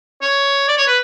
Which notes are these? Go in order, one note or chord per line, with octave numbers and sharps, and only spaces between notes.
C#5
D5
C#5
B4